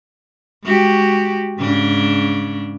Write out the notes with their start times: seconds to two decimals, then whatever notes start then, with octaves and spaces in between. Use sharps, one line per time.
0.63 G#3 F#4 G4
1.58 G#2 C#3 D4